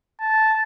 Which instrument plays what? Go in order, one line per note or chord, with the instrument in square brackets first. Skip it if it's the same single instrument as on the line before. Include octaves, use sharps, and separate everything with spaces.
[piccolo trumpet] A5